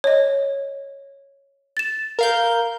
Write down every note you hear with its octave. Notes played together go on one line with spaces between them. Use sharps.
C#5 D#5
A6 E7
A#4 F5 G6